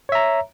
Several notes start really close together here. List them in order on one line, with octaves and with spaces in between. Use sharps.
C#5 E5 A#5